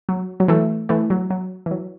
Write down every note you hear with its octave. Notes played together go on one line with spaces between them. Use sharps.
F#3
F#3
E3 A3
E3 A3
F#3
F#3
E3
F#3